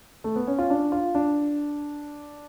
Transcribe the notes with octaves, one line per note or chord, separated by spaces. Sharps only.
A3
B3
C#4
F4
D4
F4
D4